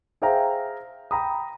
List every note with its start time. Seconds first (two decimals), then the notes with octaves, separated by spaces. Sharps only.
0.22 G#4 C5 E5 F5 G5 A#5
1.11 G5 A#5 B5 D#6